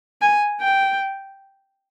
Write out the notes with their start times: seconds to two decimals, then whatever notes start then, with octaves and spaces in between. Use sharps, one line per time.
0.22 G#5
0.61 G5